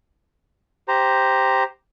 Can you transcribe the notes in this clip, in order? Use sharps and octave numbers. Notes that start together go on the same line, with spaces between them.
G4 C5 A#5